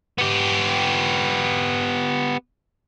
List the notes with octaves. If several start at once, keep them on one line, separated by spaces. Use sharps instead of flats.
B3 G4